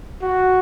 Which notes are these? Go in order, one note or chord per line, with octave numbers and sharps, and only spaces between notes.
F#4